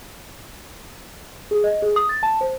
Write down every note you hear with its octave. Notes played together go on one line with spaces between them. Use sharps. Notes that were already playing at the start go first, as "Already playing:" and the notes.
G#4
D#5
G#4
D#6
A6
A5
C5